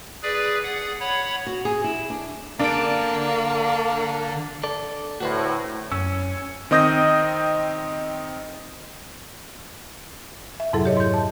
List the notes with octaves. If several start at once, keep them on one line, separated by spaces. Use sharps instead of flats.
G#4 B4 D5
G#4 F#5
C#5 F#5 B5
F#4
G#4
E4
D4
D3 A#3 D4 A5 D7
A4 D5
D2 A2 F#4 B4 C5
F#2 C#4 E6
D#3 C4 D#5 D#6 G6 A#6
E5
F2 G#2 C3 F#3 E4 A4
G4 C#5 D#5
C6 G6
A5